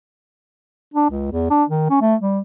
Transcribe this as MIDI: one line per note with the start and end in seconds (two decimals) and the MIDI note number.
0.94 1.09 62
1.10 1.29 37
1.32 1.46 40
1.50 1.64 62
1.69 1.85 51
1.90 2.00 61
2.01 2.15 57
2.21 2.39 55